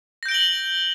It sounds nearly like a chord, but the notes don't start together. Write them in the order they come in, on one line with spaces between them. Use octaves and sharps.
A#6 G6 D7 G7 F#7